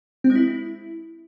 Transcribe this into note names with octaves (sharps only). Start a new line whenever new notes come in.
C4
G#3
E4